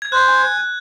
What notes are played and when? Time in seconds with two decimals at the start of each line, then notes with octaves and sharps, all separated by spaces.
0.02 G#6
0.12 C5 F#6
0.28 G#5